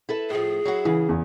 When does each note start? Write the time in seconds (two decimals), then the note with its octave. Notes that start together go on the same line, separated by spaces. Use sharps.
0.09 E4 A4 B4
0.30 A2 F3 G#4
0.65 F#3 E4 F#4
0.85 C#3 E3
1.09 E2